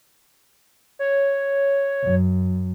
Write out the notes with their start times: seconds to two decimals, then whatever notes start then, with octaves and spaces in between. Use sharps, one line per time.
0.99 C#5
2.04 F#2